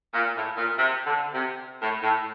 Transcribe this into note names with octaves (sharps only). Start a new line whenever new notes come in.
A#2
A2
A#2
C3
D3
C3
A2
A2